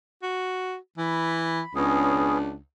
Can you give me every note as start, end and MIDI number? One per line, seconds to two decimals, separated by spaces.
0.23 0.76 66
0.98 1.61 52
0.98 1.73 83
1.75 2.59 37
1.75 2.38 59
1.75 2.38 61
1.75 2.54 62
1.75 2.38 68